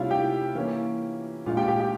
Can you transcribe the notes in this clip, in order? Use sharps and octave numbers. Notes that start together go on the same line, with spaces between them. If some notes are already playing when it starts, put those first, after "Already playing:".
Already playing: C3 G3 C#4 E4 F4 E5 F5
G4 G5
E3 A#3 C#4
A#2 F3 G#3 F4 F5
G4 G5
G4 G5
G4 G5